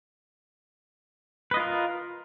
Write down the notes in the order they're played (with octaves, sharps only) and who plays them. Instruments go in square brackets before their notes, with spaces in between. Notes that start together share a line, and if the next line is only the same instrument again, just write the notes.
[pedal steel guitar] B4
D#5
F4
A#4